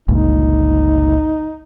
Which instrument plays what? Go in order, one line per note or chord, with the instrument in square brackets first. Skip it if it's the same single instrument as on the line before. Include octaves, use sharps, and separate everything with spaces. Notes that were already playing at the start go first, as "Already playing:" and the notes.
[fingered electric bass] G1 C#2 A#2 [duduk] D#4